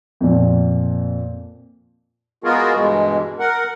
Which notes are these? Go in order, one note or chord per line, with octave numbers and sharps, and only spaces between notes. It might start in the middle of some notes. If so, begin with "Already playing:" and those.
F2 A#2
G#3 B3 F4 F#4 G#4 A#4
G2 B2 E3 G#3
A#4 F#5